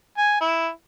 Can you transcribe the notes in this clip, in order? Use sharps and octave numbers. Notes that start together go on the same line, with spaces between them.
G#5
E4